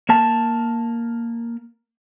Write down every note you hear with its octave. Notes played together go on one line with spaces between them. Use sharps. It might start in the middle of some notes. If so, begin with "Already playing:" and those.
A#3 A#4 A5